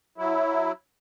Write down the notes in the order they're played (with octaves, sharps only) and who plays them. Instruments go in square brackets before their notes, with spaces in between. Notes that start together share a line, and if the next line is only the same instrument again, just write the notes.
[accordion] F#3 E4